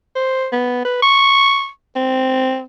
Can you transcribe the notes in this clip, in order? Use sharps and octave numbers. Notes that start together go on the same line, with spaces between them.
C5
B3
B4
C#6
C4